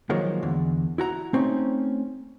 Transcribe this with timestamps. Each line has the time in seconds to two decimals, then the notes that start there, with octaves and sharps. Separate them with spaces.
0.10 D#3 F3 F#3 G#3 A#3
0.43 E2 D3
0.98 E4 F#4 A#5
1.33 A3 C4 C#4 D#4